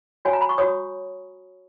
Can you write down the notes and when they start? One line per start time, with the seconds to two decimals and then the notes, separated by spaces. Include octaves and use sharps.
0.25 F#4 C#5 G#5
0.33 A#5
0.41 B5
0.49 C#6
0.58 F#4 C#5 D#6